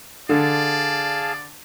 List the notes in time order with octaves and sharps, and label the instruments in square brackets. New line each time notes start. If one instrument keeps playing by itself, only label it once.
[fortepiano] D3 [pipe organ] G#4 F5 A5 [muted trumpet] D5